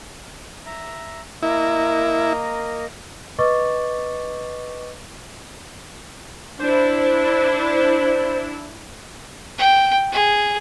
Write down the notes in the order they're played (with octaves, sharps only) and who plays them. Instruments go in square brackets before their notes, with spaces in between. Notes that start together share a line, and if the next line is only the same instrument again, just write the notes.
[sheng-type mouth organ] E5 A#5
[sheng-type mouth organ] A#3 A#4 D#5 [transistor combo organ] E4
[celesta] B4 D#5 C#6 D6 A6
[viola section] D4 E4 [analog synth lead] C5
[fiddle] G5
G#4